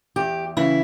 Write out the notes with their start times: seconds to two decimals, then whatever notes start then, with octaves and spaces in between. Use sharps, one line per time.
0.16 E2 G4
0.57 C#3 E3 E4